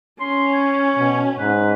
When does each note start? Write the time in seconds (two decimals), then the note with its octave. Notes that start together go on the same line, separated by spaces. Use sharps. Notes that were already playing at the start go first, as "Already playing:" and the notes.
0.20 C#4 C6
0.53 C#5
0.97 B2
1.39 G#2 B4